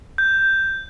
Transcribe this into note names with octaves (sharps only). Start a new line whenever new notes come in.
G6